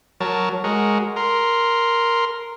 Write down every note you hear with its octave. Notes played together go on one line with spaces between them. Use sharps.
F#3 A#4 C#5 A5
G#3 F#4 A#4
A#4 C6